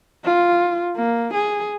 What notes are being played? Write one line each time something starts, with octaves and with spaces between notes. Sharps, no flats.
F4
A#3
G#4